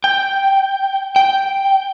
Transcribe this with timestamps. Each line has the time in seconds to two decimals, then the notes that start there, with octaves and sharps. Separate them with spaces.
0.04 G5
1.16 G5